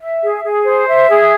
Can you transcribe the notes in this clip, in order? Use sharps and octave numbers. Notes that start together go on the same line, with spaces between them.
E5
G#4
G#4
C5
E5
G#4